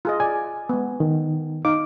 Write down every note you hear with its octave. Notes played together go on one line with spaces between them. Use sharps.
F4 G#4 D#5
D5 G#5
G#3 B3
D#3
D#4 F5 D6